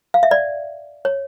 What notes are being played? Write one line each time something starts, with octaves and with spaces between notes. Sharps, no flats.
F5
E5
D5
C#5